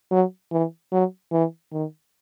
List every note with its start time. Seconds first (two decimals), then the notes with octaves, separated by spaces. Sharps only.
0.11 F#3
0.51 E3
0.92 F#3
1.32 E3
1.72 D#3